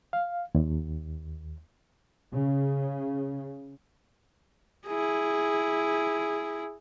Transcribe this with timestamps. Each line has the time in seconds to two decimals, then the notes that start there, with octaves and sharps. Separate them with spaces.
0.13 F5
0.55 D#2
2.32 C#3
4.86 E4 G#4